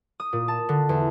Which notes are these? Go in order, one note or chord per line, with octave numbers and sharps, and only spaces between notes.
D#6
A#2
A5
D3
E2